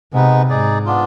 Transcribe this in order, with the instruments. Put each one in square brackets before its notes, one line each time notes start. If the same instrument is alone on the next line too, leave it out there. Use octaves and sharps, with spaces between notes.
[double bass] C3 [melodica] G#3 B3 D#4 B4
[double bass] G#2 [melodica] D#4 G#4 D5
[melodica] B3 D4 F4